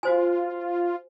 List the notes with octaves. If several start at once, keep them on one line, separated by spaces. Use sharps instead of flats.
F4 F#4 C5 G#5